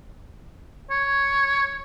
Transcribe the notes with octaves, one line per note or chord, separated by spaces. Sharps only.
C#5